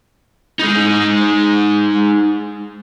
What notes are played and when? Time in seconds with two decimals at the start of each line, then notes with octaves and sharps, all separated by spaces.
0.59 G#3 D#4